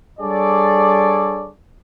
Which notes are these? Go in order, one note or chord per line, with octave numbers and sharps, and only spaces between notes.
G3 D4 G#4 A4 C#5 D5